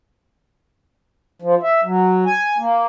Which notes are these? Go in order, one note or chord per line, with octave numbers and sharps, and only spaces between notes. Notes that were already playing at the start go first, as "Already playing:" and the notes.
F3
E5
F#3
G#5
A#3